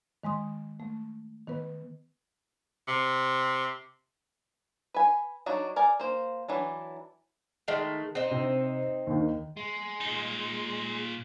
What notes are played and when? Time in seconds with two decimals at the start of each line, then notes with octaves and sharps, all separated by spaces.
0.23 D#3 G#3 C6 D#6
0.80 A3
1.47 D#3 B3 B4
2.88 C3
4.94 B4 G#5
5.46 F#3 D4 D#4 F#4
5.76 A#4 D5 G#5
6.00 A#3 C5
6.48 E3 F#3 D4
7.68 D#3 G#3 A3
8.15 C4 D#4
8.31 C3
9.07 D#2 D#3
9.57 G#3
10.01 A#2 D#4